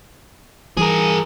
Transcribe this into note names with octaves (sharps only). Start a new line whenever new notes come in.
E3 G3 G#4 A#4